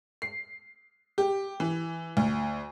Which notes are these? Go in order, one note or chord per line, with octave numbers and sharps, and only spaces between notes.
C7
G4
E3
D2